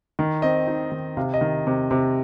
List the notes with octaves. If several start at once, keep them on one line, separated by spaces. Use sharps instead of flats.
D#3
C4 D#5
D#4
D#3
C3 F5
D#5
D#3
C3
C3